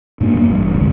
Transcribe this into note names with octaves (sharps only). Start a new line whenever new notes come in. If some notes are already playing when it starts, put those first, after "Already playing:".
G2 B2 A#3 D4
F1 F#3 A3 A#3
A1 G2
F1 C2 G#2 D3